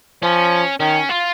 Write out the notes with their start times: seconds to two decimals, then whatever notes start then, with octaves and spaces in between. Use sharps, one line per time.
0.23 F3 C#4
0.80 D#3 C#4
1.09 F4